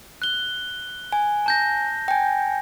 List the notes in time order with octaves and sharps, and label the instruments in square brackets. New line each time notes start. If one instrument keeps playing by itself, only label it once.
[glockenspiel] F#6 G7
[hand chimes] G#5
[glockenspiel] A5 G6 A#6
[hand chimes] G5 G#5